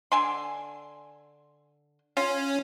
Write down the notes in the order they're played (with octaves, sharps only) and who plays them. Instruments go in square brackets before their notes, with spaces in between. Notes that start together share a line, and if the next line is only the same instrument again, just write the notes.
[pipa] D3 G#5 C6
[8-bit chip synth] C#4 [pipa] F4